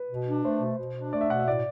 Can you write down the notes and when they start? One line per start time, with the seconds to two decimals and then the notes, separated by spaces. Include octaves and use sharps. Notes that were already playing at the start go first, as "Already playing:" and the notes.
Already playing: B4
0.10 B2
0.27 D4
0.44 A3 C5
0.61 B2
0.78 B2
0.96 D4
1.12 A3 D5
1.21 E5
1.29 B2 F#5
1.39 E5
1.47 A2 D5